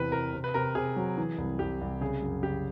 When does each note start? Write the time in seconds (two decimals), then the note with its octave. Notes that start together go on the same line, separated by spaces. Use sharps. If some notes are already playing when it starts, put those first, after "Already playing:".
Already playing: E2 C3 E3 B4
0.12 C3 A#4
0.34 C3
0.44 B4
0.54 C3 A#4
0.75 C3 G#4
0.96 F#3
1.18 E3
1.38 C2
1.59 C2 G4
1.81 C2
2.01 C#3 G#4
2.22 F#2
2.43 C#3 G4